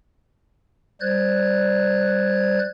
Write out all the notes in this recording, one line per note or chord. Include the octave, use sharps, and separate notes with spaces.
G3 C5 D5 F#6 G#6